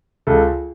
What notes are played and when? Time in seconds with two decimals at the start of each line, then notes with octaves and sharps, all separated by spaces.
0.27 C#2 A4